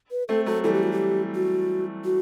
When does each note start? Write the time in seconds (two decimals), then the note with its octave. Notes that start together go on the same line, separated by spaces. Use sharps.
0.11 B4
0.28 A3 C4 A4
0.46 F#3 A3 A4
0.64 E3 G3 A4
0.74 G4
0.83 F#4
0.92 G4
1.35 F#4
2.05 F#4